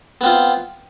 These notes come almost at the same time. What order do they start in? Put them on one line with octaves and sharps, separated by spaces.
B3 C4 F4